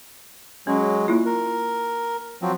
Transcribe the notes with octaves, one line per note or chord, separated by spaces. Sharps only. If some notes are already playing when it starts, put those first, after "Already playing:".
F#3 G#3 C#4 C#5
A#3 E4 F4
A#4
F3 F#3 C4